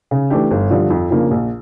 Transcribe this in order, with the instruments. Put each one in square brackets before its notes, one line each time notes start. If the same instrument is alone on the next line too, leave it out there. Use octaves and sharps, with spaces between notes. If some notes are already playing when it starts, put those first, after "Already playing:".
[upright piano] C#3
E3 A3 D4 G4
G1
G2 D3 F3
F2
C#3 F3 A#3 D4
A#1